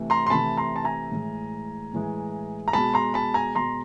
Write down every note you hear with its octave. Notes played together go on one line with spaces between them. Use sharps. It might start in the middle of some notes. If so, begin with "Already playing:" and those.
Already playing: C3 E3 A3
A#5 C6
C6
C3 E3 A3 A5 B5
A#5 C6
A5
G#5 A#5
A2 E3 G#3
A2 E3 G#3
A#5
B2 G#3 A5 B5
A#5 C6
A5 B5
G#5 A#5
B2 G#3 A#5 C6